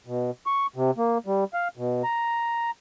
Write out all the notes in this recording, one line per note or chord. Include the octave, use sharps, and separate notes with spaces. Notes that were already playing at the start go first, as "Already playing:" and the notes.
B2
C#6
C3
A#3
G3
F5
B2
A#5